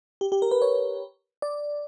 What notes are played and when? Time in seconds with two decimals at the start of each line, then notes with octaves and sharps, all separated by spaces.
0.21 G4
0.32 G4
0.42 A#4
0.51 B4
0.62 C#5
1.42 D5